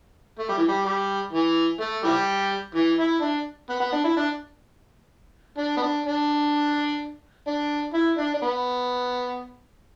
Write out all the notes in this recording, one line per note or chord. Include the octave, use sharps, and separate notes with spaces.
A3
G3
E3
G3
G3
E3
A3
E3 G3
E3
E4
D4
B3
B3
D4
E4
D4
D4
B3
D4
D4
D4
E4
D4
D4
B3